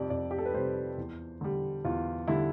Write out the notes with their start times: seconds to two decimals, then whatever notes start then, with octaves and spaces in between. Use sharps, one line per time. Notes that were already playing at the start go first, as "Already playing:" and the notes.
Already playing: F2 C3 G3 D5
0.10 F2 D5
0.31 G4
0.38 A4
0.46 B4
0.53 C3 G3 C5
0.97 E2
1.41 D3 G3
1.85 E2 F4
2.27 D3 G3 E4